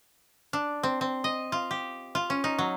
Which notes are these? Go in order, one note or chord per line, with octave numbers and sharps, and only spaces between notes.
D4
C4
C4
D#5
F4
G4
F4
C#4
D#4
F#3